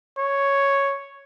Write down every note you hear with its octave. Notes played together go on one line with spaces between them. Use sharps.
C#5